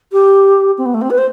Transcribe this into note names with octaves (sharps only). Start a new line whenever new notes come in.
G4
C4
B3
A3
C4
B4
C5